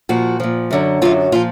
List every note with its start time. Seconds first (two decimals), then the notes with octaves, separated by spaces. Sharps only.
0.09 A#2 F3 F#4
0.40 A#2 F3
0.71 F#2 D3 F#3
1.02 F#2 D3 F#3 F4
1.32 A#2 F3 F4